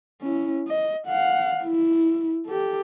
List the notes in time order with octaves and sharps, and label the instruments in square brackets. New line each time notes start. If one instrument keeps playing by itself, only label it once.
[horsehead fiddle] C#4 E4
D#5
F5 F#5
E4
G4 A4